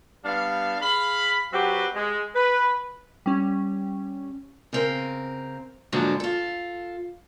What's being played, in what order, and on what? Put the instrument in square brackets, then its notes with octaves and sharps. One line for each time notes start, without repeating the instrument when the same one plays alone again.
[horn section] G3 B3 D4 F5
G#4 F5 B5
F#3 C4 F#4 G4 B4
G#3
B4
[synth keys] G3 C#4
[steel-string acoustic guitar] C#3 C4 A#4
G#2 D3 F3 F#3 A#3 D4
F4 A4